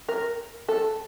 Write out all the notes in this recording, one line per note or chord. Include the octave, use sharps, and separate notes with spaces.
A#4
A4